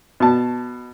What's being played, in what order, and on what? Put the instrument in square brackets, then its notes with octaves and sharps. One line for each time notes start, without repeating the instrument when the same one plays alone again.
[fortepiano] B2 A5